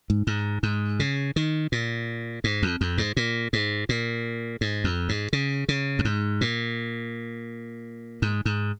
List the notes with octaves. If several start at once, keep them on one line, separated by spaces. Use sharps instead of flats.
G#2
G#2
G#2
C#3
D#3
A#2
G#2
F2
F2
G#2
A#2
G#2
A#2
G#2
F2
G#2
C#3
C#3
F2
G#2
A#2
G#2
G#2